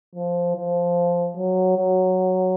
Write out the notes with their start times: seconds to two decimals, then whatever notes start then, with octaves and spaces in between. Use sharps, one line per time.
0.15 F3
0.56 F3
1.37 F#3
1.76 F#3